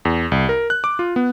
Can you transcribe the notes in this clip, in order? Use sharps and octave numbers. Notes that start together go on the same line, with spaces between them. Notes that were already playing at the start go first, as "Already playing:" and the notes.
E2
C2
A#4
F#6
D6
F4
B3